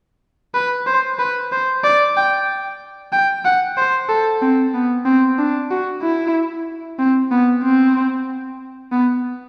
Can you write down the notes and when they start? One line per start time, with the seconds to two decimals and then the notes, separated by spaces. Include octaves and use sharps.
0.54 B4
0.87 C5
1.19 B4
1.52 C5
1.83 D5
2.16 G5
3.12 G5
3.44 F#5
3.77 C5
4.09 A4
4.42 C4
4.74 B3
5.05 C4
5.38 D4
5.71 F#4
6.02 E4
6.99 C4
7.31 B3
7.63 C4
8.92 B3